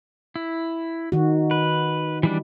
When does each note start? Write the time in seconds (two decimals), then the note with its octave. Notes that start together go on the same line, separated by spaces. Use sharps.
0.36 E4
1.12 D#3 F#4
1.51 B4
2.23 E3 G3 D4